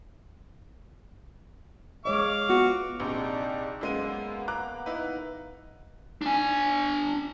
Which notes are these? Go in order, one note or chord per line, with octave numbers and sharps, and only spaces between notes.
G#3 C#5 D#5 F5 D6
B3 F4 F#4
A#1 C3 D4 D#4 G4
F#2 G#3 A#3 B3 D#7
A#5 D6 F#6
D#4 E4 B4
D4 G#5